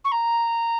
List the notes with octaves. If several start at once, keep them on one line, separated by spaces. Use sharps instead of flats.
C#6
A#5